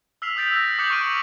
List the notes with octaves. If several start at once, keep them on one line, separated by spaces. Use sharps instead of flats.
E6 F6 B6 C7 F7
D#6 E6 G6 A6 B6 D7
E6 F#6 A#6
D6 D#6 F#6 G6 C#7 F#7
C#6 D#6 F6 D7 D#7
B6